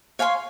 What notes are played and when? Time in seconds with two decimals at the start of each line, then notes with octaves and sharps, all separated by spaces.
0.19 C#5 F5 G#5 C6